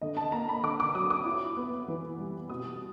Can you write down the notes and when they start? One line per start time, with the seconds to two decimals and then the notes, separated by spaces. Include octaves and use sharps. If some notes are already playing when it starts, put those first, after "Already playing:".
0.01 D3 D#5
0.17 A5
0.32 A#3 A#5
0.48 B5
0.63 D3 D6
0.80 D6
0.95 F#3 D#6
1.10 D6
1.25 E4
1.57 B3
1.88 E3
2.19 G3
2.49 B2 D#6